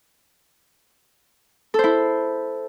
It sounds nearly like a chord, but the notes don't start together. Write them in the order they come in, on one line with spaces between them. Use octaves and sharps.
A4 C5 E4